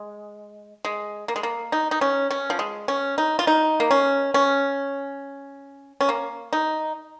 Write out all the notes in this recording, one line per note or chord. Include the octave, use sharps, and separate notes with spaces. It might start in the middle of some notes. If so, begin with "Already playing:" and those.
Already playing: G#3
G#3
A#3
G#3
A#3
D#4
D#4
C#4
C#4
F3
G#3
C#4
D#4
F4
D#4
A#3
C#4
C#4
C#4
A#3
D#4